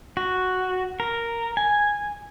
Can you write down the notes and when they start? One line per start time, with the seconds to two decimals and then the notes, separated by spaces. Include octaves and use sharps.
0.17 F#4
1.00 A#4
1.57 G#5